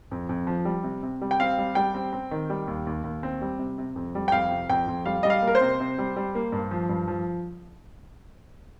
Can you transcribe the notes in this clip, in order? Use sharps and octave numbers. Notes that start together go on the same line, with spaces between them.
F2
F2
F3
G3
C3
C3
G3
G5
C4 F5
G3
G3 G5
C4
C4
D#3
G3
D#2
D#2
D#2
C4
G3
C3
C3
F2
G3
G5
F2 F5
C3
F2 G5
F2
G3 F5
G3 D#5
F5
A#3
A#4
C5
C3
C3
G3
G3
A#3
G2
F3
G2
F3